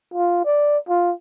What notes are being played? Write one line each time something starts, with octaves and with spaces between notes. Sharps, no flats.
F4
D5
F4